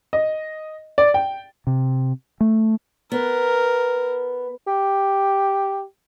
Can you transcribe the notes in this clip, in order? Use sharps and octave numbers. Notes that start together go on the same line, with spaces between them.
D#5
D5
G5
C3
A3
B3 A#4
G4